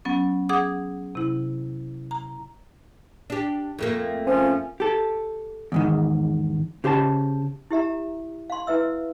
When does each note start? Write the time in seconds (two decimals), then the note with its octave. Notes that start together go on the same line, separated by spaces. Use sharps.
0.05 F#3 B3 C#4
0.49 G#4 F#5 D6 D#6
1.15 C3 E4
2.11 A#5
3.30 D4 G4
3.79 F2 A3 A#3
4.26 F3 C#4
4.80 G4 A4
5.72 E2 G#2 D#3
6.84 C#3 G4 C5 A5
7.71 E4 G4 E5 A#5
8.50 F5 C6
8.67 E4 B4 E5 E6